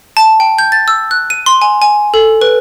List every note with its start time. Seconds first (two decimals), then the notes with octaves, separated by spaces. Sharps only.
0.17 A5
0.40 G5
0.59 G6
0.72 A6
0.88 E6
1.11 F#6
1.30 D#7
1.46 C6
1.62 G#5
1.82 G#5
2.14 A4
2.41 B4